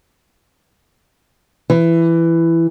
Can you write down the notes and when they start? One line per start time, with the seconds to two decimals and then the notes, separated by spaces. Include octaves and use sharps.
1.70 E3